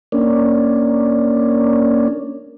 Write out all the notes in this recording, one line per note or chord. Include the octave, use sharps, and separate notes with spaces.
A#3 C#4 D4